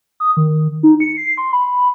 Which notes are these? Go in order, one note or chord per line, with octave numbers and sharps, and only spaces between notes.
D#6
D#3
D#4
C#7
C7
C6
B5